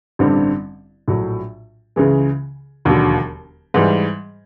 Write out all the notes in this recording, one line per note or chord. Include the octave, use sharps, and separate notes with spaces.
A1 G2 D3 G3 C4
A#1 A2 F#3
C#2 C#3 E3 G#3
E1 D#2 D3 F#3
G#2 E3 G3